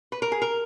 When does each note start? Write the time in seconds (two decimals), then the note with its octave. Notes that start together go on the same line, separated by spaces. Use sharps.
0.12 B4
0.22 A#4
0.32 G#4
0.42 A#4